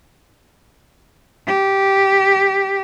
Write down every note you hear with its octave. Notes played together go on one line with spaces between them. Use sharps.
G4